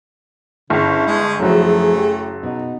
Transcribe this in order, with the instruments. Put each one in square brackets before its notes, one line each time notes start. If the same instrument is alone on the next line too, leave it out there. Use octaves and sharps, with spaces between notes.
[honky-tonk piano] G1 [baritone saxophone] C#3 [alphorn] E4
[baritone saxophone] G#3
[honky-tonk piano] F#1 F#3 [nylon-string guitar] F3 E4 [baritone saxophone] A3 [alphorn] G#4
[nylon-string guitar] E4 G4
[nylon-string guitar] B2 [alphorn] D#4